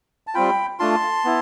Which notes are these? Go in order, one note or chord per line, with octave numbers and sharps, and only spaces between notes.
A5
G3 C4 F4 G5 B5
A3 D4 F4 A5 C6
B3 E4